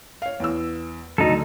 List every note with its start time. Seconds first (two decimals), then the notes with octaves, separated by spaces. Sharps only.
0.22 C#5 F5
0.40 E2 E6
1.18 D2 D3 F#3 D#4 A4